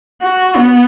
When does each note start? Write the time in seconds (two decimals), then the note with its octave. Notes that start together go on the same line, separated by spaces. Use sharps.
0.22 F#4
0.56 B3